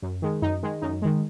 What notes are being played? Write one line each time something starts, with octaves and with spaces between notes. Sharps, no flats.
F#2
D#3 G#3
F#2 D#4
D#3 G#3
F#2 D#4
D#3 G#3